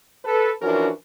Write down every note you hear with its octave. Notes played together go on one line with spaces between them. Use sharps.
A4 B4
E3 F3 C#4 D4 F#4 A#4